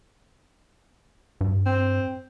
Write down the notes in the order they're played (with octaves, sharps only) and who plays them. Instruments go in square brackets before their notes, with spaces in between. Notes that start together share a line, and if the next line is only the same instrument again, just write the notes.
[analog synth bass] G2
[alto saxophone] C4